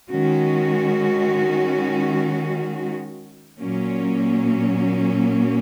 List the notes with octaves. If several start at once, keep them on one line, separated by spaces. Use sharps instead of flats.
D#3 G#3 C#4 F#4
A#2 F#3 A#3 C#4